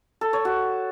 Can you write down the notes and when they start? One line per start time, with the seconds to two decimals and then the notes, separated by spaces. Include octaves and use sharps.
0.21 A4
0.33 C#5
0.45 F#4